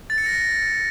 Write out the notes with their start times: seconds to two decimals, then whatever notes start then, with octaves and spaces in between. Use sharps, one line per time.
0.10 A6
0.18 C#7
0.26 A#6